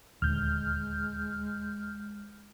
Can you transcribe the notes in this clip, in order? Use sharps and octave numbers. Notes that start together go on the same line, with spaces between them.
D#1 D2 G#3 F6 G6